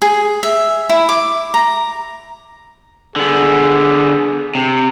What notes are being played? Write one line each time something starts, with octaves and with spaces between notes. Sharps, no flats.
G#4
E5
E4
D6
A#5
D3 B3 G#4
C3